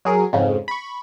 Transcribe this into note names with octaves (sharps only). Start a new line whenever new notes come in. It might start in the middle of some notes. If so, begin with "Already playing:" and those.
F#3 G#4 A#4
F2 G#2 C#3
B5 C#6